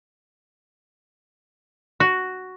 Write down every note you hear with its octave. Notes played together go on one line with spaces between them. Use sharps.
F#4